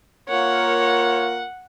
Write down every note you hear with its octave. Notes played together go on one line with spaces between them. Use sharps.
A#3 F4 A#4 C#5 F#5